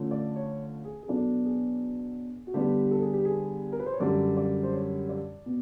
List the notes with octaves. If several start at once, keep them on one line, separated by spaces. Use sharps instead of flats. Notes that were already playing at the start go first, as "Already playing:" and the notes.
Already playing: D3 F3 A3 C#4
D5
C#5
G#4
G#4
B2 F#3 B3 D4 A4
G#4
F#4
D3 G3 B3 D4 G4
A4
G#4
G4
G#4
A#4
B4
C5
C#5
F#2 D3 G3 D5
D5
C5
C#5
D5
B2